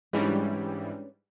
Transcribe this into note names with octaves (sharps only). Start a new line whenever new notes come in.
G#2 E3 G3 G#3 C#4 D4 B4